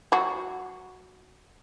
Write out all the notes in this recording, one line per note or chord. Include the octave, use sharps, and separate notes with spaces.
F#3 F#4